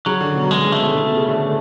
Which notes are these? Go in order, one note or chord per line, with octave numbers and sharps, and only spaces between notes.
C#3 F#3
D3
B2
C#3 G#3
C#3
A3
B2
D3
C#3
B2
C#3
D3